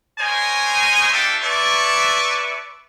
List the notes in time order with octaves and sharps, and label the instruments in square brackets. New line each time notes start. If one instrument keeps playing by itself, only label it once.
[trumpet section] A#4 C5 C#5 D#5 G#5
A#3 D4 F4 A4 E5 G5
E4 B4 D5 E5 A5 C#6